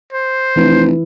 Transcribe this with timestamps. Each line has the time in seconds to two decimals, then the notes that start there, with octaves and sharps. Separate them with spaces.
0.13 C5
0.56 F1 E3 E4